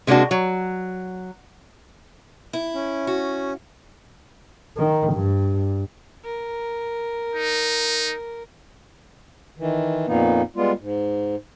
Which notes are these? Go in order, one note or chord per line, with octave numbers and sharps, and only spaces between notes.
C3 G#3 A#3 D4 F#4
F#3
E4
C#4
F#4
D#3
G2
A#4
D#4
D#3 E3
F2 A#2 A#3 B3 D#4
G3 G#3 B3 F4
G#2